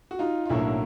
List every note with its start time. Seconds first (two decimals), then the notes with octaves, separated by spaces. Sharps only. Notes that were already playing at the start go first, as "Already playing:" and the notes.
0.11 F#4
0.19 D#4 F4
0.45 F4
0.49 B1 A2 F#3 A#3 D4 E4